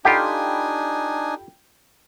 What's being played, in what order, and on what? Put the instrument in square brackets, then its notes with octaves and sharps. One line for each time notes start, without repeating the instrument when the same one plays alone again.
[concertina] D4 D#4 G#5 [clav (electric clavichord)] F4 G4 [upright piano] A4 G5 B5